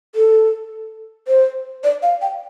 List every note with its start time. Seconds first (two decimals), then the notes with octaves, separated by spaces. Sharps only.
0.15 A4
1.28 C5
1.84 D5
2.03 F5
2.22 G5